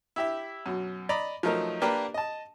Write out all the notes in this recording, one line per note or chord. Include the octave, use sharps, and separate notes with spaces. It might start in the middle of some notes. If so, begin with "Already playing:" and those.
E4 G4 E5
F#2 B2
D5 D#5 A#5 B5
F3 F#3 A3 D#4 A#4
A#3 D4 G4 A#4 B4
D#5 A5